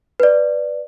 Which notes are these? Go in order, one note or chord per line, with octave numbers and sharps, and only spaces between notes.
B4 D5